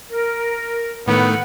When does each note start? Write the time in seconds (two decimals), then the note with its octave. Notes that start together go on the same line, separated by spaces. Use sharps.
0.11 A#4
1.07 A2 D#3 A3 B3 F#5